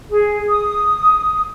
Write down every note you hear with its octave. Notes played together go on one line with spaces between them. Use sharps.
G#4
D#6